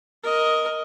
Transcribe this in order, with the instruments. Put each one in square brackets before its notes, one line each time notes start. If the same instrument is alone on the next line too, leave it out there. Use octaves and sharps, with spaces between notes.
[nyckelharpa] A#4 D#5